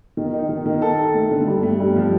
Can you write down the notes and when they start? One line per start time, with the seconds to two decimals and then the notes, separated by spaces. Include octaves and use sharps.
0.17 D#3
0.34 D#4
0.49 D#3
0.66 D#3
0.82 A4
0.99 A4
1.14 A3
1.31 D3
1.47 G2
1.63 A3
1.80 G2
1.96 F3